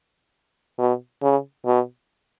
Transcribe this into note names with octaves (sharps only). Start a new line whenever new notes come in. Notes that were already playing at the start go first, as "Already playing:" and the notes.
B2
C#3
B2